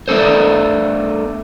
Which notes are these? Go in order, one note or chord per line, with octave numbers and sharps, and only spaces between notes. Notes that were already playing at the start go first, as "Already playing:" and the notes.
A3 B3 D4 A4 C5